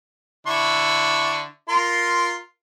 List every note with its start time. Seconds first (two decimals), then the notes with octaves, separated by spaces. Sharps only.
0.47 D3 E4 C#6
1.69 F4 A#4 C6